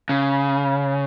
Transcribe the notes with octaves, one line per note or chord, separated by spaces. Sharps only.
C#3